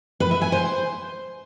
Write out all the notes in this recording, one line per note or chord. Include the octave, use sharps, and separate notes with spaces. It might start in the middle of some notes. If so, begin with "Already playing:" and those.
B4
E5
G#5
C5